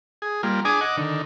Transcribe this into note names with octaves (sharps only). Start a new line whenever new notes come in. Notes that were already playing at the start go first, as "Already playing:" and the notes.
G#4
G3 A#3 F4
D4 G#4 G#5 D6 D#6
D#5 F#5 D6
D3 D#3